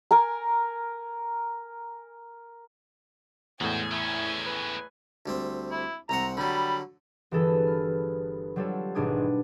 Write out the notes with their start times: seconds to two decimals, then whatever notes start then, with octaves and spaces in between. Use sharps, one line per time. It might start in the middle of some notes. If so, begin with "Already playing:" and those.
0.11 A#4 G#5 A#5
3.61 E2 A2 G#3 F#4 C5 G#5
3.92 A3 C#4 E4
4.47 B4
5.26 D2 G3 C4
5.70 E4
6.09 C2 C4 F#5 A#5
6.37 D3 F#3 G3 B5
7.31 G1 E3 G#4 A4 B4
7.67 F6
8.56 F#3 G3 C4 F4 A4 C#5
8.95 G#1 G#2 B2 D4 D#6 G#6
9.17 G3